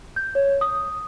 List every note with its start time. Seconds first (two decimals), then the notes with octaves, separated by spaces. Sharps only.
0.16 G6
0.35 C#5
0.61 D#6